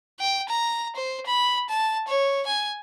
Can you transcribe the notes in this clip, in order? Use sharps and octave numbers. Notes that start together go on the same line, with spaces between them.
G5
A#5
C5
B5
A5
C#5
G#5